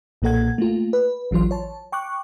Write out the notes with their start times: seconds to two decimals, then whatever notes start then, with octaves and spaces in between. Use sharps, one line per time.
0.22 B1 A#2 A#3 A4 F#5 G#6
0.58 A3 A#3 F4
0.93 B4
1.31 A1 E3 F#3 F4 C6
1.51 C#5 A5
1.92 G5 C#6 D6 F#6